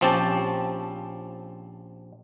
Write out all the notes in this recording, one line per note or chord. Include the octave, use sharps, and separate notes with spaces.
A#1 F3 C4 C#4 G4 A5